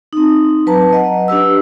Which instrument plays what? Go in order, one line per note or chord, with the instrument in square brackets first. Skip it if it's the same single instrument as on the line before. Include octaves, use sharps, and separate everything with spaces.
[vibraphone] C4 D#4
F#3 B4 A5 A#5
D#5 F#5
D4 G4 B4 E6